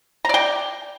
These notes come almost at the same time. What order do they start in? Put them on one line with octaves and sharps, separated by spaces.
A#5 D5 G5